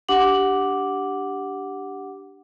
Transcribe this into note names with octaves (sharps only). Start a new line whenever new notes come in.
D4 G4 F#5 D6 F#7